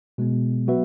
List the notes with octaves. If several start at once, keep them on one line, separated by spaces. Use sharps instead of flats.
B2 G#3 B3
F#3 B3 F#4 B4 E5